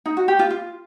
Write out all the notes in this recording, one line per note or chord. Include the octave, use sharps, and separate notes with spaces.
D#4
F#4
G4
F4
F4